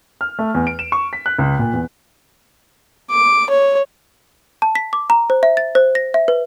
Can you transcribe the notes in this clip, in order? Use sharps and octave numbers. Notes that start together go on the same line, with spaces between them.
F6
A3
E2
D7
E7
C#6
B6
F#6
C#2
A#2
E2
D6
C#5
A5
B6
D6
A#5
C5
E5
A6
C5
A#6
E5
B4